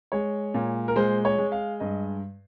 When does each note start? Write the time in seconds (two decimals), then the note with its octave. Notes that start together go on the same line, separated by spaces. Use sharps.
0.12 G#3 C#5
0.54 A#2
0.88 A#4
0.96 G#3 C5
1.25 C#5
1.38 G#3
1.52 F5
1.80 G2 D#5